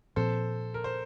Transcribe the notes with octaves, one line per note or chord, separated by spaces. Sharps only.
A#2 F3 C4 A4 C5
A#4
C5